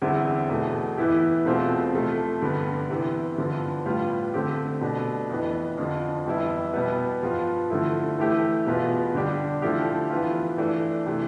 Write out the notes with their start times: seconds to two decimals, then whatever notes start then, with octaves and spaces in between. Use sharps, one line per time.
0.02 E2 D3 G3 C4 E4
0.49 E2 B2 A3
0.97 E3 B3 E4 G4
1.45 E2 B2 A3 C4 F4
1.93 C3 F3 A3
2.41 G2 D3 G3 B3
2.90 C3 E3 B3
3.38 G2 D3 F3 B3
3.86 A2 G3 B3 F4
4.34 D3 A3 C4 G4
4.81 B2 A3 D4
5.30 F2 E3 B3
5.77 F2 D3 F3
6.26 F2 E3 G3 B3 E4
6.74 B2 G3 B3
7.22 G2 F3 B3 F4
7.70 D3 F3 A3 E4
8.18 E3 A3 E4 G4
8.66 E2 B2 B3 F4
9.15 D3 G3 D4 G4
9.62 D3 F3 A3 E4 G4
10.10 E3 B3 F4
10.58 E3 A3 D4
11.06 C3 E3 A3